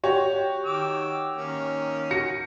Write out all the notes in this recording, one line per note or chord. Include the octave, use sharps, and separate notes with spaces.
F#4 G4 C#5
D#3 D6 E6
D#3 A#3 C#4
F#4 A#6 C#7